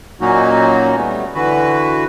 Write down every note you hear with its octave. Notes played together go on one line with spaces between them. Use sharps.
A#2 F#3 A#3 C#4 D#4 F#4
G3 A3 B3
D3 E3 F#4 B4